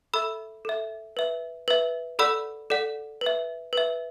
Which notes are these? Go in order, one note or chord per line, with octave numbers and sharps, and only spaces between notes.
A4 E5 B5 E6
A4 E5
B4 E5
B4 E5
A4 D5 F#5 B5 E6
A4 D5 F#5
B4
E5
B4 E5